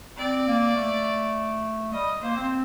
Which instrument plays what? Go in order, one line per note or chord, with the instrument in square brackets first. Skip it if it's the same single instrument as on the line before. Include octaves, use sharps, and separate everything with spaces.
[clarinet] C4 [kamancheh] D5
[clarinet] A#3
A3
[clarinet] G3 [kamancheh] D#5
[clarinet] A#3 [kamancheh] C5
[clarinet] C4